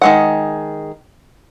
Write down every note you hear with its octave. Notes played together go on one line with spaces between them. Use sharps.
D#3 G#3 F#5